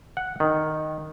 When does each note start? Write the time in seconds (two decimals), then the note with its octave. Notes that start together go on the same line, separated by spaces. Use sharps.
0.17 F#5
0.40 D#3